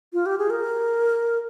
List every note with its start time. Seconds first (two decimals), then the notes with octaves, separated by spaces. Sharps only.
0.13 F4
0.26 G4
0.38 G#4
0.50 A#4